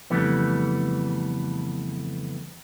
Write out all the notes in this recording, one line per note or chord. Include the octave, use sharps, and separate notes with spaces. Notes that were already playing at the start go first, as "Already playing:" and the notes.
F2 C#3 E3 G3 A3 B3